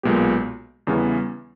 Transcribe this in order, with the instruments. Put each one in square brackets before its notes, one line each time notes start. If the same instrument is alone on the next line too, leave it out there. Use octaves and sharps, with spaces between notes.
[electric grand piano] B1 A#2 G#3 B3 G4
E2 C#3 E3 G3 B3